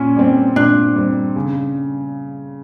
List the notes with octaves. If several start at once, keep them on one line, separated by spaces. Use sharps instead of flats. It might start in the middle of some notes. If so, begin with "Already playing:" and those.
Already playing: A#2 C#4
G3 C4
A#2 D4
G3 C4
C#3